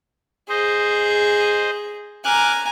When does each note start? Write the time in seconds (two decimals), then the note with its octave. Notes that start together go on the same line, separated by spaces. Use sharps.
0.49 G#4 C5 D#5
2.24 G#5 A#5 D6 F6 F#6